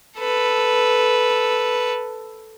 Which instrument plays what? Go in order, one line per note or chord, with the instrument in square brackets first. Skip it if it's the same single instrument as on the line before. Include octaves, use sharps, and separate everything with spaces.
[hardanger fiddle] A4 B4